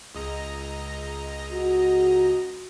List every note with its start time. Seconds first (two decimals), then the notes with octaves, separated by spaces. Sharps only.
0.15 C#2 D#5 A#5
1.52 F#4